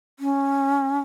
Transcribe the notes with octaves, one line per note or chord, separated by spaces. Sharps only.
C#4